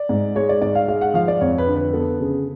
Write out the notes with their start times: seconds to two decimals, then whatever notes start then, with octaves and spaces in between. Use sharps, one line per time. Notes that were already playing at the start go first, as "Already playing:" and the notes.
Already playing: D5
0.09 G#2
0.36 G#3 C#5
0.49 D5
0.61 G#2 D5
0.75 F5
0.88 G#3 F5
1.01 F#5
1.14 F3 F5
1.28 D5
1.41 F2 C#5
1.58 B4
1.67 D3
1.75 B4
1.93 B3 A4
2.20 C#3 G#4